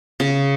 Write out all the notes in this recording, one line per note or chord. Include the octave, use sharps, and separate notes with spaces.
C#3